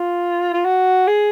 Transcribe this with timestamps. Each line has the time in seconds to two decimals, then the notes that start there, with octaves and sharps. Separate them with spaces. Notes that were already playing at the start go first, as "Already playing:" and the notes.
Already playing: F4
0.54 F4
0.65 F#4
1.07 G#4